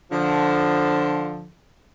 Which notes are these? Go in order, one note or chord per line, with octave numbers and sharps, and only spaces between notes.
D3 F3